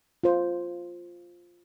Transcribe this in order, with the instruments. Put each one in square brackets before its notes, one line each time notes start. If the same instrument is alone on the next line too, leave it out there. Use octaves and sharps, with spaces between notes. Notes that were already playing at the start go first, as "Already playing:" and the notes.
[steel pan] F4 C5